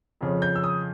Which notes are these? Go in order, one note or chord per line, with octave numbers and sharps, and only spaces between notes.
F2 C#3 F3
G6
E6
D#6